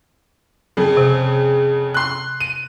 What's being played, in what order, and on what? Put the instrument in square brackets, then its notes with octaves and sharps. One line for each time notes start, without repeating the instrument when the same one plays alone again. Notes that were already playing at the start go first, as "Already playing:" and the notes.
[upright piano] F2 C#3
[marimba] C3
[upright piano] C6 F#6
D#7